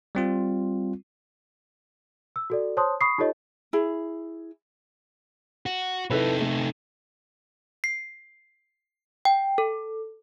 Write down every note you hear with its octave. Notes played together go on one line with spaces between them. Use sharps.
G3 C4 F4
E6
F#4 A4 D5
C5 C#5 A5 C6 D#6
B5 C#6 D#6 C7
D#4 F4 G4 A4 C#5 D#5
E4 G#4
F#4
C3 D#4 E4 A4 B4
A3
C7
G5
A4